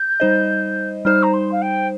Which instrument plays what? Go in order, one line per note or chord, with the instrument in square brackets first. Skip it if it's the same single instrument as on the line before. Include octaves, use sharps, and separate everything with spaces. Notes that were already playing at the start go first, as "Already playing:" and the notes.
Already playing: [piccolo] G6
[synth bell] G3 D#4 C5 D#5
[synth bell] G3 D#4 C5 [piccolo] F6
[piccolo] A#5
C6
F5
G5